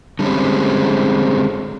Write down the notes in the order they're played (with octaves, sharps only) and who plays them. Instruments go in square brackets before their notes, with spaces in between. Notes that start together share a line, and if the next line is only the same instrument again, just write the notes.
[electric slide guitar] D3 G3 G#3 C4 C#4